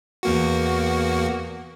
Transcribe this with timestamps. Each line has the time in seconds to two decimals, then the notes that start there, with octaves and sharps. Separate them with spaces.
0.23 E2 A#3 F#4